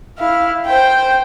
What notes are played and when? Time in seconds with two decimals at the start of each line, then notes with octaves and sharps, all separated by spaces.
0.19 E4 F5
0.66 C5 G5